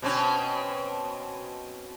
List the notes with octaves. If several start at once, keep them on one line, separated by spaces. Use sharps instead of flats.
B2 C4 C#4